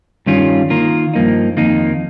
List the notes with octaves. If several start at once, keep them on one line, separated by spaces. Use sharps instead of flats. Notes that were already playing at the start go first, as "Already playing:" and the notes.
G2 D#3 G3 C#4 F4
D#3 A#3 F4 A#4
G2 F3 A#3 D#4
F2 D#3 A#3 D#4